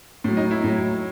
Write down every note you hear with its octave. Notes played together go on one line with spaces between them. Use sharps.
A2 F#3
D#4
E4
A2 F#3